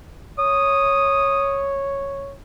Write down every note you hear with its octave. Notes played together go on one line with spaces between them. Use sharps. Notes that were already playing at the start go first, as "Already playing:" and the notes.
C#5 D#6